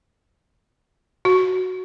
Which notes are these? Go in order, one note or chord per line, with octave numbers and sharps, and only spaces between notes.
F#4